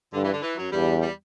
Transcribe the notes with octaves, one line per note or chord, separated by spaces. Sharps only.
G2 D3
E3
D3
E3
F#2 F#3
E2 G2 G3
G3